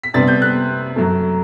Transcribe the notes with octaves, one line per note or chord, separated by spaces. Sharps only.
B6
C3 G3 B3 D4 A6
G6
F#6
F#2 F#3 A3